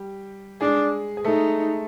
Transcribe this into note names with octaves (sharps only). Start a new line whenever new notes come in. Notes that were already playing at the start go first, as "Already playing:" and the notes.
Already playing: G3 G4
G#3 D4 G#4
G#4
A3 D#4 A4